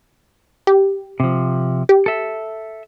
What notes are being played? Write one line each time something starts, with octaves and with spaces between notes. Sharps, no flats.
G4
C3 F3
G4
A4 E5